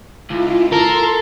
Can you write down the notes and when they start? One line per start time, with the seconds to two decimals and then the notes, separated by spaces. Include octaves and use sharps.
0.31 C#2 E4 F4
0.72 A4 A#4 C6